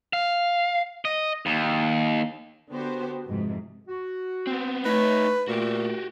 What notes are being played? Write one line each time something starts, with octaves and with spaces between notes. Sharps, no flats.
F5
D#5
D#2
D3 B3 F#4 G4 C5
F2 G#2 C3
F#4
B3 C4
A3 D#4 B4 C#5
A#2 A3 F#4 G4